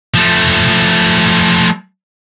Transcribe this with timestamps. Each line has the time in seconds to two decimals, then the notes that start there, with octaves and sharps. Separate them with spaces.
0.14 F3 A3